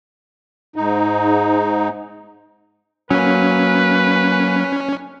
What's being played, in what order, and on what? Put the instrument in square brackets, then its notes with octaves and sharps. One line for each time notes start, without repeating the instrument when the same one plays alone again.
[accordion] G#2 D#4
[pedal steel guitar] F#3 A#3 [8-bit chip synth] C#4 [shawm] B4